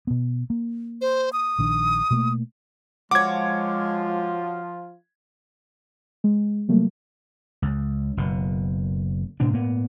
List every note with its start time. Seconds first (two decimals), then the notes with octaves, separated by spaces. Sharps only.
0.07 B2 B3
0.50 A#3
1.01 C5
1.33 D#6
1.59 A#1 D#3 D4
2.11 B2 A3 A#3
3.11 F3 G#3 F4 F#4 C#5 D6 G#6
6.24 G#3
6.68 C3 F#3 G3 A3 A#3
7.62 C#2
8.17 F#1 B2
9.40 A2 C3 D4
9.53 A2 A#3 B3